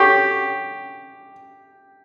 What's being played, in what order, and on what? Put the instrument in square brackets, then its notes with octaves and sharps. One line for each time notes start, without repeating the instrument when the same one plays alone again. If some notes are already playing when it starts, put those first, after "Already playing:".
Already playing: [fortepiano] G4 [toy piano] A4 C#5 F#5 C#6